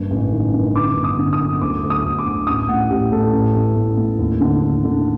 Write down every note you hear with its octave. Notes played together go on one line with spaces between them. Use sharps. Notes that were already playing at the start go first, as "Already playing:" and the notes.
Already playing: F#1 G2
A1
D#3
G2
D3 D6
G1
D#6
D3
D#6
F#2
D2 D6
D2
D#6
D2
D6
D2
A1 D#6
A2 F#5
A1 G4
A2 A4
A1
A1
A2
A2
D#2
D3
D3
D3